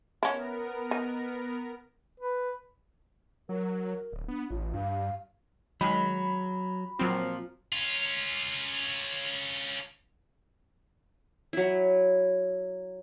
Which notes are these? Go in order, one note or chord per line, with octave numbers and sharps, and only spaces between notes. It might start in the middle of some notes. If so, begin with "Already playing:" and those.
B3 C#4 E4 A#4
D#4
B4
F#3 A#4
D1
B3 D4
A1 F4
G2 F5
D#3 F#3 G#3 B5
A#2 F3 F#3 C4
C#4 F4
F#3 E4